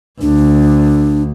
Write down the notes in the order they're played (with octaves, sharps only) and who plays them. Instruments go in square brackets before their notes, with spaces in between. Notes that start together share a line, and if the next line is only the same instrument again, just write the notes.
[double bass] D2 [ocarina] D4